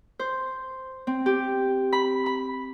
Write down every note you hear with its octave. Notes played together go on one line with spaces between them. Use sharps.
C5
C4
G4
B5
B5